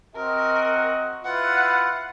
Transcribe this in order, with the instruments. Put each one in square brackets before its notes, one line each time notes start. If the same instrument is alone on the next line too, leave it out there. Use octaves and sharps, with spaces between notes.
[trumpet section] C4 F#4 D#5 [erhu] A#4
[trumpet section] E4 F4 B4 [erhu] F#5